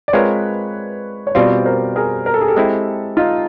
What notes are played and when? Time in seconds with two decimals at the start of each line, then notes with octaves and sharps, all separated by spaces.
0.08 D5
0.13 G#3 C4 F4 A#4 B4 C#5
1.27 C#5
1.35 B2 G3 C4 F4 C5 D5
1.65 A#4 C5
1.96 G#4 A#4
2.26 A#4
2.34 A4
2.41 G#4
2.48 G4 A4
2.56 G#3 C4 E4
3.17 D#4 F4